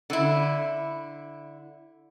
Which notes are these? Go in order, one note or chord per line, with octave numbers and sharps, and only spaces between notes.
D3 E4